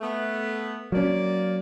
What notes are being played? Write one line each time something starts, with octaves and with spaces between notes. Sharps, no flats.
A3 B3
F#3 A#3 C#4 D5